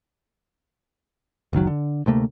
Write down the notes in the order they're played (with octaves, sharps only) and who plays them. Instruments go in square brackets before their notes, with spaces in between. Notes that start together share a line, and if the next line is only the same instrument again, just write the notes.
[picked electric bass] F#1 C#2 D#3 F#3
D3
D2 C3 A3 A#3